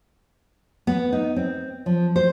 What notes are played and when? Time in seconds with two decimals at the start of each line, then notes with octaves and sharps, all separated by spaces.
0.87 B3
1.12 D#4
1.36 C4
1.86 F3
2.16 C5